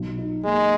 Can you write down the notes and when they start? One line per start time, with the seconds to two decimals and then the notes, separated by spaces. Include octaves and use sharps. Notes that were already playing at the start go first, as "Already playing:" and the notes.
Already playing: B1
0.18 D#4
0.44 G#3 A#3